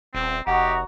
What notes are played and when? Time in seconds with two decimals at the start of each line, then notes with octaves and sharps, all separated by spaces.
0.15 D#1 C4
0.47 F1 F#4 G4 D#5 F#5 A#5